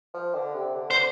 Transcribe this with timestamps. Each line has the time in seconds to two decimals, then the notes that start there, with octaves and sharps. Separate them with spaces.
0.14 F3
0.35 D3
0.55 C3
0.75 D3
0.91 C5